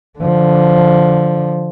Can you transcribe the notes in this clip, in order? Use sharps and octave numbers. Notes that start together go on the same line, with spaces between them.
D3 F3